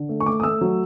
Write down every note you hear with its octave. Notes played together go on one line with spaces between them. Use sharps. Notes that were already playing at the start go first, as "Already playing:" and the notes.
Already playing: D3
A3
C#6
A3 D6
D#6
A3 E6
F#3